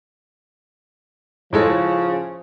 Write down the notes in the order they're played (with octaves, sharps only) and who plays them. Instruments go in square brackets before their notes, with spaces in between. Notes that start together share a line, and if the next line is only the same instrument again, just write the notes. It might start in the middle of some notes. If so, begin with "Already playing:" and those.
[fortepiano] A2 G#3 A4 [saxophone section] C#3 [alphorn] F3